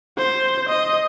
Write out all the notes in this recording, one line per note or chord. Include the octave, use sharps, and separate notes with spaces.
C5
D#5